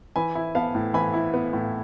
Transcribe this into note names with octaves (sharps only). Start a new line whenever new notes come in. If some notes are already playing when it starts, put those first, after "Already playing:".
E3 G#5 B5
E4
B3 F5 A5
A2
E3 G#5 B5
E4
B3
A2